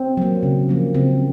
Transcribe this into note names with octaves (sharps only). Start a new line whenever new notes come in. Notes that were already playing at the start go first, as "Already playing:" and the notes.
Already playing: C4
F#3 A#3
C#3
F3 A#3
C#3 C4